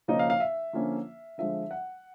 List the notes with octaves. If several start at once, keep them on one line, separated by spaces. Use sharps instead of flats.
C#3 F3 A#3 D#4 D#5
F5
F5
E5
D3 F3 A#3 C#4
D3 F3 G#3 E5
F#5